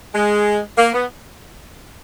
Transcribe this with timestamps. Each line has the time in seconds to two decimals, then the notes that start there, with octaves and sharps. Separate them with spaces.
0.15 G#3
0.78 A#3
0.93 B3